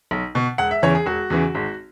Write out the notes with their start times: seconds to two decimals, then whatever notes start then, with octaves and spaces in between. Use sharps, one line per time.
0.11 B1
0.35 B2
0.58 E1 F#5
0.71 E5
0.82 E2 C#3 E3 C#5
0.95 G#4
1.06 E1 F#4
1.30 E2 C#3 E3
1.55 G#1